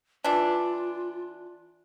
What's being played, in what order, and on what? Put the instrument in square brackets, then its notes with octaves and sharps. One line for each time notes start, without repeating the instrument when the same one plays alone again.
[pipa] E3 D4 [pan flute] F4